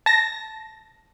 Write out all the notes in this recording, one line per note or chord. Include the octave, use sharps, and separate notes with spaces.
A5 A#6